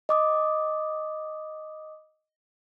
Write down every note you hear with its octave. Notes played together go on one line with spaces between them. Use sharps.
D#5 D6 D#6